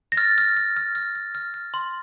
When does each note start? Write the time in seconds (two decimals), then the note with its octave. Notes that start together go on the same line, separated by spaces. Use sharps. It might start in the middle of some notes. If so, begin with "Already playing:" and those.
0.12 A#6
0.17 F6 A6
0.38 F6
0.57 F6
0.77 F6
0.95 F6
1.15 F6
1.35 F6
1.54 F6
1.74 C6